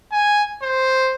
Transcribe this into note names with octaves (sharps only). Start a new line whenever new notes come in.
G#5
C5